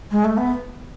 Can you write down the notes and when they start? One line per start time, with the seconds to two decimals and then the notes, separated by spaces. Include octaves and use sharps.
0.11 G#3
0.24 A3
0.37 B3